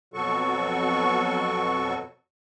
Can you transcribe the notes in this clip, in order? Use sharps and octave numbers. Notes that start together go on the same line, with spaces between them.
F2 B2 F#3 F#4 A4 C#6